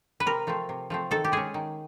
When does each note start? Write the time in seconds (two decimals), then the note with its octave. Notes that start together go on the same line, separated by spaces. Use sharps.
0.20 B4
0.26 C3 A#4
0.47 F3 A3 C4
0.69 C3
0.90 F3 A3 C4
1.11 D#3 A4
1.24 G4
1.32 G#3 C#4 G#4
1.54 D#3